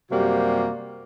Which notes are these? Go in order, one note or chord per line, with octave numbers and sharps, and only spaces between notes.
F#2 C3 G3 A#3 F#4